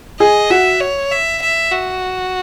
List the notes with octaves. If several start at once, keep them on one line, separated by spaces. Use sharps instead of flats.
G#4 D#5
F#4 E5
C#5
E5
E5
F#4